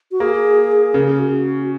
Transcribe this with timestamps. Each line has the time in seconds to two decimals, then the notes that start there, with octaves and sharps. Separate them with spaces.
0.11 F#4
0.20 A#3 G#4
0.94 C#3 A#4
1.07 G#4
1.19 F#4